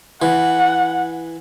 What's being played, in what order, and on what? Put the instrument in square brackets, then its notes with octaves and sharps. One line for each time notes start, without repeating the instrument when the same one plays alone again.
[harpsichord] E3 [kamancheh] F#5